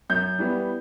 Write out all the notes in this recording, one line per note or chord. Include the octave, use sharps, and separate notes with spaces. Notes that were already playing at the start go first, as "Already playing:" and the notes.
F#2 G6
E3 G3 B3